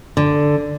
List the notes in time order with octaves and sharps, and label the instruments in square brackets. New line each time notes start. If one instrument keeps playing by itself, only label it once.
[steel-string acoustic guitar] D3